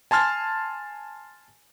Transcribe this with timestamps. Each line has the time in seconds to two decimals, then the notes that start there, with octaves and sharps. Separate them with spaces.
0.11 G#5 A5 C6 F6 A6